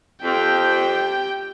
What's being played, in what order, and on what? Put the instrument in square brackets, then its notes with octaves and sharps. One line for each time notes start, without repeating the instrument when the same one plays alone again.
[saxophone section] F2 [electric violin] G4 G5